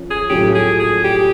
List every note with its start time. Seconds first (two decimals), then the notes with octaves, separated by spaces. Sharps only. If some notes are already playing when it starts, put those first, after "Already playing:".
Already playing: F3 C#4
0.10 G#4
0.29 A2 F#3 A3 C#4 F4 G4
0.55 G#4
0.80 G#4
1.04 G4